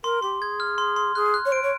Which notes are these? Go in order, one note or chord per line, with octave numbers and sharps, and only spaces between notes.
A#4 C6
G4 C6
G#4 G#6
F6
C6
C6
G#4 F#6
F#6
C#5
C5 D7
C#5